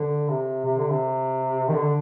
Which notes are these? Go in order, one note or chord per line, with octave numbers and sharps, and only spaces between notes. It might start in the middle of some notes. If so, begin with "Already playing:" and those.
Already playing: D3
C3
C3
D3
C3
D#3
D3